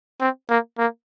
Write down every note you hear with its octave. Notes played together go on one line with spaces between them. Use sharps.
C4
A#3
A#3